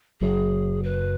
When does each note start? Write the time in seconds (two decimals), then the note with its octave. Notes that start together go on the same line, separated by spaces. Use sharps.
0.20 F#1 F#2 F#3 G#4
0.83 B4